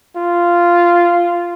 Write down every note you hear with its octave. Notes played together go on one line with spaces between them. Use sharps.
F4